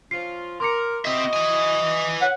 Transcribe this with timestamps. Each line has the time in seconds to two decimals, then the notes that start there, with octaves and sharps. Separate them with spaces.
0.11 F3 C#4 F4 C7
0.60 A#4 C6 D6 C#7
1.05 C4 E4 F#4 D#5 E5
1.33 B4 G#5
2.22 C#5 F#5